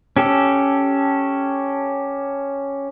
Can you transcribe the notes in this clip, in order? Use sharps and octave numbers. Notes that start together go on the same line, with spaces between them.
C#4 G4 A4